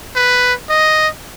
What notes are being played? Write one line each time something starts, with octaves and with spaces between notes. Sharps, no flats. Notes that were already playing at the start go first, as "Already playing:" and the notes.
B4
D#5